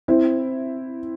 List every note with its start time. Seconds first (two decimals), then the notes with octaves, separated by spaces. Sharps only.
0.08 C4 E4